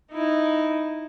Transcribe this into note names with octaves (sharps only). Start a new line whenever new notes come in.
D#4 E4